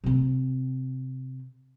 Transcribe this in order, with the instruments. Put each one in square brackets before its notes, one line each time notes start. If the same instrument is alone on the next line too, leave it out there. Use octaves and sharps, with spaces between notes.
[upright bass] C3 C4